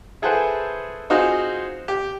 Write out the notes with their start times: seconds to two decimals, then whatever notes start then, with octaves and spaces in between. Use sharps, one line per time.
0.22 E4 G#4 A4 B4 C5 F#5
1.10 C4 D#4 F4 F#4 G#4 C5
1.88 G4